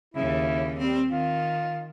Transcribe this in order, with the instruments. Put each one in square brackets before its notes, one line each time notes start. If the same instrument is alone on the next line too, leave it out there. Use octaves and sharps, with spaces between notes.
[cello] D#2 C#3 [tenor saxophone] E4
[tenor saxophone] G3 [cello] C4
[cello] D#3 [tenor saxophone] F4